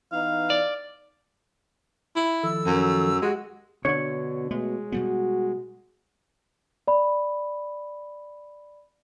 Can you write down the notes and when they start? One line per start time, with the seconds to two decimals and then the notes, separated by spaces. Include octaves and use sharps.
0.12 E3 B3 D#4 F5
0.50 D5
2.16 E4
2.43 D#3 F3 A4 E6
2.66 F#2
3.22 G#3 F#4 G4 F#5
3.85 B2 D3 C#4 D4 C#5
4.51 B2 G#3 A3
4.92 B2 G3 B3 F#4
6.88 D5 B5